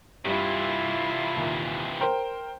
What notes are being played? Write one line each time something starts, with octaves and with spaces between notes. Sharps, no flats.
G2 C3 E3 E4 F4
D#2 A#2
A#4 C5 G5